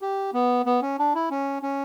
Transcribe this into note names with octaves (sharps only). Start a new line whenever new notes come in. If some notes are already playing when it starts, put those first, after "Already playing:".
G4
B3
B3
C#4
D4
E4
C#4
C#4